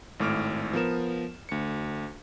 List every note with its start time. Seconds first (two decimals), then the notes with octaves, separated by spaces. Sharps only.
0.20 G#1 A2 D6 F6 D7
0.73 F3 B3 A#4 E7
1.49 D2 C#7